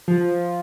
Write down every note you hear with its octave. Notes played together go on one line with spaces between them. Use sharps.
F3